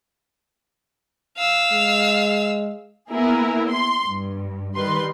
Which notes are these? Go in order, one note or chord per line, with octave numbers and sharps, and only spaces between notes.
F5 E6
G#3
A#3 B3 E4 G#4 A#4
C6
G2
D#3 G3 B4 C6